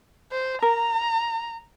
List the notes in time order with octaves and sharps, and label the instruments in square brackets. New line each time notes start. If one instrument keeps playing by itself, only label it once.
[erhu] C5
[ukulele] A#4 [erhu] A#5